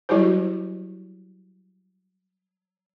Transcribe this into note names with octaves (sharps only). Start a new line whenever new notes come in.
F#3 G3 E4 F#4 G4 C5